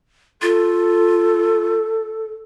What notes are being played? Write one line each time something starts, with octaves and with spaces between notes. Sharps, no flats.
F4 A4